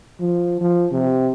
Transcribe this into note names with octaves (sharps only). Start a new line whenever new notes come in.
F3
F3
C3